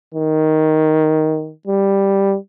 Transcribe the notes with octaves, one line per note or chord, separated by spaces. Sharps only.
D#3
G3